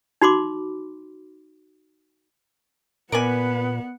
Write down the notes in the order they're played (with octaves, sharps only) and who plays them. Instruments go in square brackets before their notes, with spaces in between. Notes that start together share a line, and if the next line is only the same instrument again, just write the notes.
[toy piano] D#4 F#4 B5 C6 D6
[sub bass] A#2 [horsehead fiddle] B3 F#5 [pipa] A#4 D5 G#5 [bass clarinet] B4